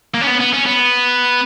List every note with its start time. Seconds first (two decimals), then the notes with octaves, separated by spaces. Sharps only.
0.14 A#3
0.21 C#4
0.27 B3
0.41 B3
0.54 C#4
0.66 B3